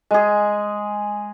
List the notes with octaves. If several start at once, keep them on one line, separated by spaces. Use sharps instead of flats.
G#3 G#4